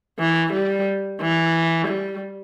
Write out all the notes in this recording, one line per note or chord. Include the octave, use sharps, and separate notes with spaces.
E3
G3
E3
G3